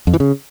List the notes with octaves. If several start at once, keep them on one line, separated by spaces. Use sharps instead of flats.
F2
E3
C#3